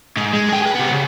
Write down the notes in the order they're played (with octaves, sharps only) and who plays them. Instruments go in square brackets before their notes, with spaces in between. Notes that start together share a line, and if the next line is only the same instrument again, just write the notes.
[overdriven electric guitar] G#2
G#3
G#4 G5
G#4 B4
C3 B3
C#3